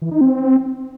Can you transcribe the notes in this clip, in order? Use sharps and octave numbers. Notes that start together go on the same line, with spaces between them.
E3
D#4
C4